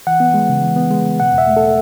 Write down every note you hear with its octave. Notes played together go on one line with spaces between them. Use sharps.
E3 F#5
B3
G#3
C#3
E3
B3
G#3
C#3
B2 F#5
E2
E5
A3
A4